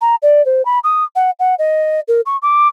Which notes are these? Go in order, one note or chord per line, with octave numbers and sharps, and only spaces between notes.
A#5
D5
C5
B5
D#6
F#5
F#5
D#5
A#4
C#6
D6